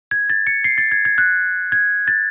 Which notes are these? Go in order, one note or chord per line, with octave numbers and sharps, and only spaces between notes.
G#6
A6
C#7
C7
A6
G#6
G#6
F#6
G#6
A6